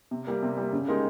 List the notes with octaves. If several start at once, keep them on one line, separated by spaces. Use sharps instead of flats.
C3
G3 A#3
C3
G3 A#3
C#3
G#3 D#4 G4 A#4